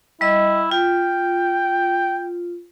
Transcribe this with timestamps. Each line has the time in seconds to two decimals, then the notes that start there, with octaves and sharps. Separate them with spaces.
0.21 G3 E4 D#5
0.71 F4 G5